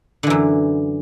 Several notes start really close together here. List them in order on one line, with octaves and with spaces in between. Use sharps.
D3 E3 F#2